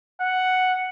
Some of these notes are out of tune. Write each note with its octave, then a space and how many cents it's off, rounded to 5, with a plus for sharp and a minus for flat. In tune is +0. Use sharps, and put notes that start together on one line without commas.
F#5 +0